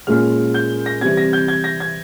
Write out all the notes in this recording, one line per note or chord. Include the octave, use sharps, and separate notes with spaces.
A#2 G#3 C#4 F4 F6
G6
A#6
C3 E3 G3 C4 G#6
A#6
G6
G#6
A#6
G#6